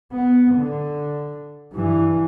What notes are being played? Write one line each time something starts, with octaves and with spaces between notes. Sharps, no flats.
B3
D3
G2 E3